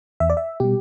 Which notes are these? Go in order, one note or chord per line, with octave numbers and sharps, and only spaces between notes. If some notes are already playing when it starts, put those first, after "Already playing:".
E2 E5
D5
E5
B2 G3 G4